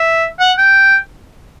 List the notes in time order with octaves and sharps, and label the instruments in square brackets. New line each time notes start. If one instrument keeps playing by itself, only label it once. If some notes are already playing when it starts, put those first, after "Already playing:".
Already playing: [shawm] E5
F#5
G5